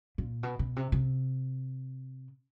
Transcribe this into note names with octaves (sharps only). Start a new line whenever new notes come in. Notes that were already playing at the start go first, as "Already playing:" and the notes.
A#2
B2
B2
C3
C3